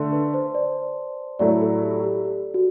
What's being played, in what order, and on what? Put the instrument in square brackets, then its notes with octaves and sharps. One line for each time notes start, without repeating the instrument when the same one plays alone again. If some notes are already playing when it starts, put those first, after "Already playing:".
Already playing: [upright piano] D3 A3 D4 [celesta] A5 C6
[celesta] B4
C5
D5
[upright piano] A2 F#3 A3 E4 [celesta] D5
[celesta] A4
G4
G4
G4
F#4